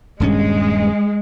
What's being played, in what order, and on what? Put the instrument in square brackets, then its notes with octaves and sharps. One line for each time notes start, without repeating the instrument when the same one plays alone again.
[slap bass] D#1 G2 C#4 [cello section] G#3